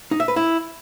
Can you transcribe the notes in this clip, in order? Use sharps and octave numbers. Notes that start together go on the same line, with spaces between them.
D#4
E5
B4
E4